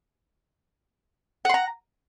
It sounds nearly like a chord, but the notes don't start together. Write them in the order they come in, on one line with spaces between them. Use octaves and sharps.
F#5 C6 A#5